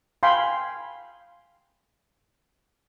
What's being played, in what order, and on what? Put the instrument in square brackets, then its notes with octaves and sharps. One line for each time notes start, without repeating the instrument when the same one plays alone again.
[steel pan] F5 G5 G#5 B5 C6